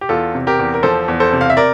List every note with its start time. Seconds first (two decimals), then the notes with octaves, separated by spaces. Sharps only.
0.01 G4
0.09 E2 F4 A4
0.34 C3
0.47 G4 A#4
0.59 E2
0.74 A#4
0.83 F3 A4 C5
1.08 E2
1.20 A4 C5
1.33 C3
1.41 F5
1.50 E5
1.57 A#4 D5